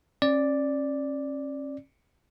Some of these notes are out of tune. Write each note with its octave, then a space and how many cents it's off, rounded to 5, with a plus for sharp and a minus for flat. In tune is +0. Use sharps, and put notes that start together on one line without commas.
C#4 -35 D5 +0